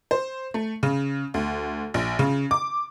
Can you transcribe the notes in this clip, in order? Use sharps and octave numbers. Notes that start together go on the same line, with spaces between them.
C5
A3
C#3
D2
A#1
C#3
D6